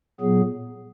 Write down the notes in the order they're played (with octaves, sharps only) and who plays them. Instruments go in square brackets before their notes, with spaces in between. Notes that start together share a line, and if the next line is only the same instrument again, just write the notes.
[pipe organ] A#2 F#3 B3 G#4